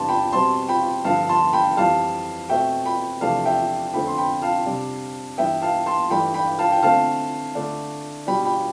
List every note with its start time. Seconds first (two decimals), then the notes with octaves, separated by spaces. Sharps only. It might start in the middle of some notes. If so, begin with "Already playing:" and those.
Already playing: E2 C3 G3 B3 D4 A5 C6
0.09 G5 B5
0.32 B2 G3 C4 A5 C6
0.68 G5 B5
1.05 G2 D3 F3 F5 A5
1.29 A5 C6
1.53 G5 B5
1.77 F2 E3 G3 F5 A5
2.49 B2 A3 C4 E5 G5
2.85 G5 B5
3.21 E2 C3 F3 A3 D4 F5 A5
3.45 E5 G5
3.93 F2 D3 A3 C4 G5 B5
4.07 C6
4.18 G5 B5
4.42 F5 A5
4.66 C3 G3 D4
5.38 G2 E3 B3 E5 G5
5.62 F5 A5
5.86 A5 C6
6.10 G2 E3 A3 D4 G5 B5
6.34 G5 B5
6.59 F5 A5
6.72 G5
6.82 D3 A3 C4 F5 A5
7.55 D3 A3 D4
8.27 B2 G3 D4 G5 B5
8.45 G5 B5